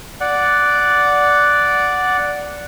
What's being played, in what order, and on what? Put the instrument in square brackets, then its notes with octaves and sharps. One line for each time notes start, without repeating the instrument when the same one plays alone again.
[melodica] D5 F#5